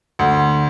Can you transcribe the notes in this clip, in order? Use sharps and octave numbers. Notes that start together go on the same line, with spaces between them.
D2